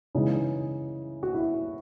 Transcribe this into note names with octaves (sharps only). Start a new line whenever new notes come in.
C#3 E3 G#3 D#4
F#4
E4